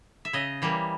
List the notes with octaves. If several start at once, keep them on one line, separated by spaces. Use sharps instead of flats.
E5
C#3 D#5
E3 G3 A#3